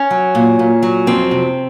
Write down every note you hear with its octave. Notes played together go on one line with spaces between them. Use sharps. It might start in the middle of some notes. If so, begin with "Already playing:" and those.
Already playing: C#4
F#3
A#2
A#2
F#3
F2 C4
C3